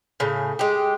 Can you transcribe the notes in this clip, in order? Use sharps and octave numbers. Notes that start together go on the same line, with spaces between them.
A2 C#3
G#3 G4